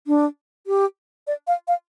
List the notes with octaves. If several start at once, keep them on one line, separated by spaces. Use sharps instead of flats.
D4
G4
D5
F5
F5